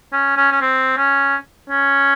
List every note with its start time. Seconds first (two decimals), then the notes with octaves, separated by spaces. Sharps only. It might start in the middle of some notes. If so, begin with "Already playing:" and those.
0.13 C#4
0.37 C#4
0.52 C#4
0.61 C4
0.97 C#4
1.70 C#4